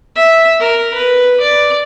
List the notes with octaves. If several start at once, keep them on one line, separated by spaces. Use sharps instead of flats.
E5
A#4
B4
D5